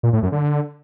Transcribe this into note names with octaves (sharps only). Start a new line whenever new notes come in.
A#2
A2
F#2
D3